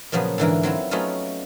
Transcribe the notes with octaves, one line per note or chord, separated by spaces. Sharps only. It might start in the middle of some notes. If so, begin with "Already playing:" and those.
A#2 C#3 F3 F#3 B3
G#2 D3 E3 A#4
F#3 C4 E4 F4
F#3 A3 B3 C#4 D#4 F4